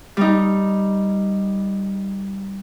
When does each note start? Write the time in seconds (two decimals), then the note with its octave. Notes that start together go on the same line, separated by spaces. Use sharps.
0.17 G3 D#4